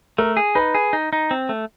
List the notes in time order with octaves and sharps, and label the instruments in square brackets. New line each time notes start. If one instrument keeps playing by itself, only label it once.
[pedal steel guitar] A3 [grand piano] A#4
[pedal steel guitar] G#4
[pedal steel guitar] D#4 [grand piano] B4
[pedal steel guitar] G#4
D#4
D#4
C4
A3